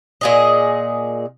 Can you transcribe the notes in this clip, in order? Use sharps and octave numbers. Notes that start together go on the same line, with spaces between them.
A#2 G#4 D#5